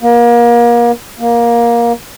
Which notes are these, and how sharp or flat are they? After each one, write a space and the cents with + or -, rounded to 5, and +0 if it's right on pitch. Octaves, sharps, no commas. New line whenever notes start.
A#3 +30
A#3 +15